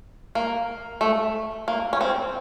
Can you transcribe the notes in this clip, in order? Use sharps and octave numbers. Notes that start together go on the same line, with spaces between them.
A#3
A3
A#3
C#4
C4